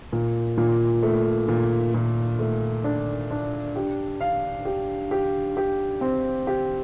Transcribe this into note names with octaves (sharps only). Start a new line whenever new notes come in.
A#2
A#2
A3
A#2
A#2
A3
D4
D4
G4
F5
G4
G4
G4
C4
G4